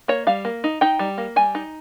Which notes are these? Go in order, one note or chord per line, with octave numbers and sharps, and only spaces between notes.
A#3 C#5
G3 F5
A#3
D#4
D#4 G5
G3
A#3
G3 G#5
D#4